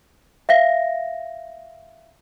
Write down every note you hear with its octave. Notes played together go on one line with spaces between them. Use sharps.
E5 F5 A#6